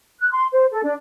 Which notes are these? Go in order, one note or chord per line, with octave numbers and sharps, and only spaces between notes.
F#6
C6
C5
A4
D4